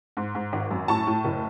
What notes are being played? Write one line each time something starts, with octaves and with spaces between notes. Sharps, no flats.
G#2
G#2
G#1
F#2
A2 A5 C#6
A2
F#1